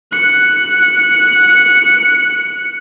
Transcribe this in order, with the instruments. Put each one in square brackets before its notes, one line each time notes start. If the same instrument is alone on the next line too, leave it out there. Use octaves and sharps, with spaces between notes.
[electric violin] F#6 C#7